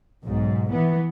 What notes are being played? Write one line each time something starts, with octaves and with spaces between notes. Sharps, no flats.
B1 G#2
E3 B3